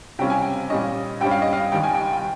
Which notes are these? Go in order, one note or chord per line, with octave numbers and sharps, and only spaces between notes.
C3 G3 C#4 F4 G5
G#5
G5
A#2 G3 C#4 D#5
G2 G3 C#4 G5
F5
D#5
F5
D#2 D#3 G3 G5
G#5
G5
G5